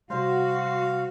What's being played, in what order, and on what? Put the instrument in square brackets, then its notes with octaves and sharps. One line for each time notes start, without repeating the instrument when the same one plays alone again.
[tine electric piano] C3 G3 [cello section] F#4 [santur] C5 C6 [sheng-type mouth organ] F5